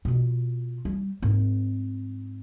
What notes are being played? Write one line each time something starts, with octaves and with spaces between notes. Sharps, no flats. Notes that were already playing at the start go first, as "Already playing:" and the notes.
B2 F4
G3
G#2 C4